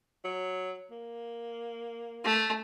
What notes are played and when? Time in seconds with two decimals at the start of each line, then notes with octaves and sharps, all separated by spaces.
0.24 F#3
0.91 A#3
2.25 A3